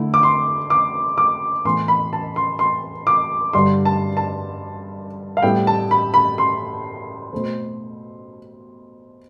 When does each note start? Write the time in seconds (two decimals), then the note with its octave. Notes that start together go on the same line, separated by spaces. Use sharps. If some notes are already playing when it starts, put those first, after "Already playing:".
Already playing: D3 A3 E4
0.14 D6
0.23 C6
0.70 D6
1.18 D6
1.65 A2 E3 B3 C6
1.88 B5
2.13 A5
2.36 C6
2.59 C6
3.07 D6
3.53 G2 D3 G3 C6
3.85 A5
4.17 A5
5.37 F5
5.42 A2 G3 B3 E4 G5
5.67 A5
5.91 B5
6.14 B5
6.38 C6
7.33 B2 A3 C4